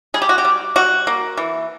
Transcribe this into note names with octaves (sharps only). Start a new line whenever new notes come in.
G3 G#4
G4
F#4
G4
G3
G3 F#4
A#3
E3